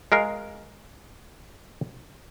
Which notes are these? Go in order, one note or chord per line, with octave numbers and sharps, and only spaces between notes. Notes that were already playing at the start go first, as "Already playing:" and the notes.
G#3 A#4 F5